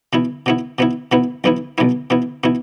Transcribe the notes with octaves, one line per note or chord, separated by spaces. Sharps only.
B2 B3 E4
B2 B3 E4
B2 B3 E4
B2 B3 E4
B1 B2 B3 E4
B1 B2 B3 E4
B2 B3 E4
B2 B3 E4